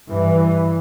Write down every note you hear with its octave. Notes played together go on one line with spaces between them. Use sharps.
G2 E3